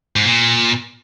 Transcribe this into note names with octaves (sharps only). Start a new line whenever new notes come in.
G#2
A#2